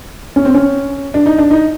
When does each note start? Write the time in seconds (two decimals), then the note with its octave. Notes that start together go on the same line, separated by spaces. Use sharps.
0.36 C#4
0.45 C4
0.55 C#4
1.14 D4
1.26 D#4
1.38 D4
1.51 D#4